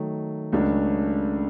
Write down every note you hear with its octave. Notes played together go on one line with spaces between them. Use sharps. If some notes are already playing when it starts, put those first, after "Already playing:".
Already playing: D#3 F#3 A3
C#2 C#3 F#3 A3 D4